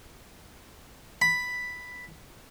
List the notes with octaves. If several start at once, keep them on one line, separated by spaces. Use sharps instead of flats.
B5